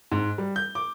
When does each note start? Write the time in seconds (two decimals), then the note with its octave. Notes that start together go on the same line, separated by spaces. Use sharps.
0.12 G#2
0.38 G3
0.56 G6
0.75 D6